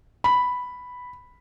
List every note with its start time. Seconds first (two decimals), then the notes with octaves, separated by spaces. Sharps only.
0.24 B5